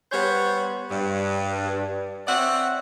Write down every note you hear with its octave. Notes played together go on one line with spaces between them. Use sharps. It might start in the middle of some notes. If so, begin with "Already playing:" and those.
G3 B3 C5 C#5
G2
C4 C#5 D5 E5 F#5